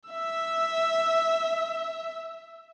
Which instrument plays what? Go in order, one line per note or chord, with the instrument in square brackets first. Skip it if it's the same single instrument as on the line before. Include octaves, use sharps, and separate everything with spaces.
[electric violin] E5 E6